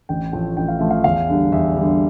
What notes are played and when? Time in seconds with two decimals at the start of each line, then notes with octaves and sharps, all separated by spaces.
0.09 A1 G5
0.33 A2 F3 A3 G5
0.57 A1 G5
0.68 F5
0.79 A2 F3 A3 E5
0.91 F5
1.04 E2 F5
1.29 D3 G3
1.52 E2 E5
1.76 D3 G3